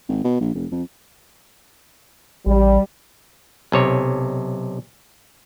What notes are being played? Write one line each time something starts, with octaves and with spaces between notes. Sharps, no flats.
G#1
B2
A#1
F1
F2
A1 G3
B1 C3 C#5